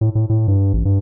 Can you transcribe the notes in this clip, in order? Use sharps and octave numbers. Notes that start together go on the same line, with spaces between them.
A2
A2
A2
G2
A1
G2